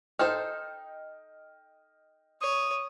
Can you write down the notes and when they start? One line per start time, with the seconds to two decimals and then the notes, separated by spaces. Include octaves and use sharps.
0.19 D#4 A4 C5 D#5 G5 F6
2.41 C#5 D#6